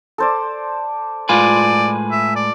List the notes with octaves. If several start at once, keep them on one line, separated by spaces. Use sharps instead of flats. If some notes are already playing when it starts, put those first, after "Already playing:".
A4 C5 D5
A2 G#3 F4 B4 D5 G#5
E5
D5